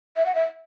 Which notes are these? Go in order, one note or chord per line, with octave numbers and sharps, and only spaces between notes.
E5
F#5
E5